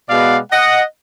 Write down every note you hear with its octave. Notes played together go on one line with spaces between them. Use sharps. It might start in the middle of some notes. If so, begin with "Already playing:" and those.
B2 G#3 B3 D5 F5
D#5 F#5